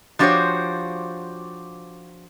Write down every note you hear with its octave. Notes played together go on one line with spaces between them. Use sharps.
F3 D4 F#4 G4 C5 C#5